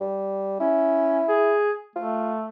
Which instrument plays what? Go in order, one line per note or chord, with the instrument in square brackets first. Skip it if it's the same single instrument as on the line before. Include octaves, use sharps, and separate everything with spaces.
[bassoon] G3
[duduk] C#4 [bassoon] E4
[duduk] G#4
[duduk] A3 [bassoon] F4